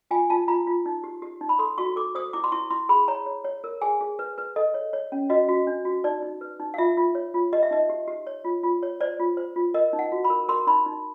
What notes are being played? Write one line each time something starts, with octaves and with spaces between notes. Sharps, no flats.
F4 G#5
F4 A5
F4 A#5
F4
D#4
G4
G4
D#4
B5
A4 C6
F#4 C#6
A4 D6
C5 D#6
E4 D6
C6
E4 C#6
E4 C6
G#4 B5
C#5 A#5
C#5
C#5
A#4
G#4 G#5
G#4
B4
B4
A4 D#5
C#5
C#5
C#4
F#4 D#5
F#4
D4
F#4
D#4 D5
D#4
B4
D#4
F5
F4 E5
F4
C#5
F4
G4 D#5
E5
D#4 D#5
G4
G4
C#5
F4
F4
C#5
C5 D5
F4
C5
F4
A#4 D#5
D#4
F#5
F#4
B5
A#4
A#4 C6
D#4 B5
D#4